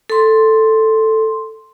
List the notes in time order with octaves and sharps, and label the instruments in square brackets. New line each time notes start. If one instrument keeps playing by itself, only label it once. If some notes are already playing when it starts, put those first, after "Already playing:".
[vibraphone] A4 C6